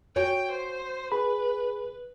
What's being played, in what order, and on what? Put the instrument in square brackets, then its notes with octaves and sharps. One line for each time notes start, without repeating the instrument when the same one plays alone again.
[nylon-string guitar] F#4 C#5 G#5 [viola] G5
[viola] C5
[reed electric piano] G#4 B5 [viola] B4